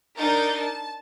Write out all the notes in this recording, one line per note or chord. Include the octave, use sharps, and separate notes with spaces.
D4 D#4 A#4 G6 A6
A5